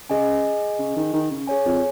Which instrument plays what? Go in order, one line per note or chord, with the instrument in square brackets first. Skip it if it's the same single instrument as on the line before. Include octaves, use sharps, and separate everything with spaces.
[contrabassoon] C#3 [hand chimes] G#4 D#5 G#5
[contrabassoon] C#3
D#3
D#3
C#3
[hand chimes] G#4 C#5 G#5
[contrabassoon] F2